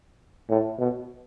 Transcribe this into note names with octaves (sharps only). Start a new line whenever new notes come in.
A2
B2